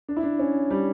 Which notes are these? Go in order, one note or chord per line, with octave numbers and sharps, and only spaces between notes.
D4
E4
D4
C#4
G3